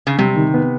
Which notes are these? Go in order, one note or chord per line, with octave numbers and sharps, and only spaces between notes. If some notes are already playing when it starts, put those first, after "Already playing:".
C#3
C3 G3
D#3
B3